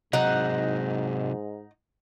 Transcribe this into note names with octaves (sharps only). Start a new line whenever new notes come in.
G#2 C3 F#3 D#4 F#5